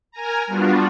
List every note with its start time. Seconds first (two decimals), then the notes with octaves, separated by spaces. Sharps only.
0.11 A#4 G#5 A#5
0.47 G3 B3 D4 F4 F#4